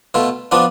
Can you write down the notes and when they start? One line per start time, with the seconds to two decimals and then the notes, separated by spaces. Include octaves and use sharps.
0.14 B2 A3 F4
0.51 F3 B3 D4 F4